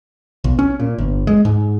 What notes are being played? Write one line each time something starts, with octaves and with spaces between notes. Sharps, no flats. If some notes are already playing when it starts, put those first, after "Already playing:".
B1
C#4
A#2
G1
G#3
G#2